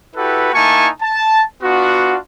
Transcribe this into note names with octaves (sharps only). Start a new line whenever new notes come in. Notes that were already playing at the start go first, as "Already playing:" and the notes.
E4 F#4 G4 A4 B4
A#3 D#4 E4 G#5 A5 C#6
A5
B3 D4 F4 F#4